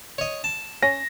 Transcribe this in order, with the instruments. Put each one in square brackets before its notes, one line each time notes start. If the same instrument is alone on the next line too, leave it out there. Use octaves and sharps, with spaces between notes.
[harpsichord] C#5 D#5
A5
[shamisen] C#4 [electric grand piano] A#6